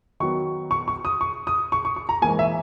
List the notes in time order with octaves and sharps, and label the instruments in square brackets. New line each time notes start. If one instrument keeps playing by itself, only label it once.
[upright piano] D#3 F#3 B3 C#6
C#6
C#6
D#6
C#6
D#6
C#6
C#6
C#6
A#5
G#2 E3 A#3 G#5
E5